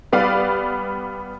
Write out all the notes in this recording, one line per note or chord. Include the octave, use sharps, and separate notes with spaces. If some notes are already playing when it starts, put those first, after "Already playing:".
G3 B3 D5 F5